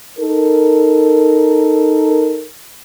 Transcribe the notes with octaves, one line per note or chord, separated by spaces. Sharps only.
D#4 A4 A#4